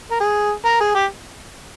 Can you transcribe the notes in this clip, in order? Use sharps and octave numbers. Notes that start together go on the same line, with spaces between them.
A#4
G#4
A#4
G#4
G4